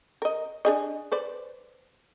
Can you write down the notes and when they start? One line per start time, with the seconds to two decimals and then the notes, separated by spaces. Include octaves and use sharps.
0.22 A#4 D#5
0.65 D4 G#4 D#5
1.12 B4 C5 D5